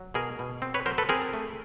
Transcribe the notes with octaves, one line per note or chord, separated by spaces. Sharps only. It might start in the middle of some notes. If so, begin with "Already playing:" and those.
Already playing: F#3
B2 G#4 A#4
B2
C4
B4 C#5
F#3 A#4 C5
A4 B4
C4 G#4 A#4
A3